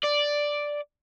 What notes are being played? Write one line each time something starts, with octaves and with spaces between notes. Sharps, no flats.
D5